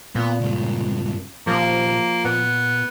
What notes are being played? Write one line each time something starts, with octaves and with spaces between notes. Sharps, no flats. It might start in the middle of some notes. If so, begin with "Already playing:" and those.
A#2 B3
C#2 G2
A#2 F3 A#3 G4
A#2 B3